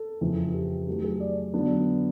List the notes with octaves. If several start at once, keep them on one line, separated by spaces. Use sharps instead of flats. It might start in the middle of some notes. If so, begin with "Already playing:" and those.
Already playing: A4
F2 C#3 E3
G4
D#3 F#3 A3 G4
G#4
D5
D3 F#3 B3 D4